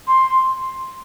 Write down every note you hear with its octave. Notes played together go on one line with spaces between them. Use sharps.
C6